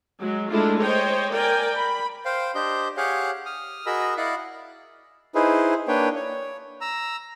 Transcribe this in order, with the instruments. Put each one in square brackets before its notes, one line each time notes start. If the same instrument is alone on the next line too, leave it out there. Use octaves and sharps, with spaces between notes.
[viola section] F#3 G#3
G#3 A3 D4 E4 F4 G#4
C5 C#5 D#5 G5
A#4 D5 G5 G#5
B5
[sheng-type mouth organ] C5 F5 G5
D4 G4 C5 D#5 G6
G4 G#4 C#5 F5 F#5
D#6 F6
F#4 G#4 A#4 D#5 B5 E6
E4 D5 D#5 F5 F#5
D#4 E4 G#4 B4 C5
A#3 D4 B4 C#5 G5
C#5
A#5 E6